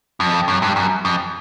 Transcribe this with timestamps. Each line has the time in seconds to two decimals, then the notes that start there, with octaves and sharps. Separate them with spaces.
0.20 F2
0.48 F#2
0.62 G2
0.76 F#2
1.05 F2